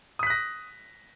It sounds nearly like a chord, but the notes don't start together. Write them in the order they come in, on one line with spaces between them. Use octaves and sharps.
D#6 B6 F#6 A#6